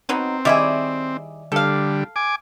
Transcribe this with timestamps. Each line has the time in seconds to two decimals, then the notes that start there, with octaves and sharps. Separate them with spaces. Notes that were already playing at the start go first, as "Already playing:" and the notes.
0.09 F#3 B3 C4 D#4
0.45 D#3 G3 E4 G#4 D5 E5
1.52 D3 G3 A4 F5
2.16 G#5 D6